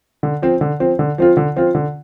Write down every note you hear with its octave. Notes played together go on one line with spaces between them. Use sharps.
D3
F3 C4
D3
F3 C4
D3
F3 C4 F4
D3
F3 C4 F4
D3